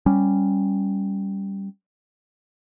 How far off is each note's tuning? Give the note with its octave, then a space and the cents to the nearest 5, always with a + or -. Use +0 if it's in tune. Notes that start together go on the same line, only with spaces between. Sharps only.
G3 +0 C#4 +0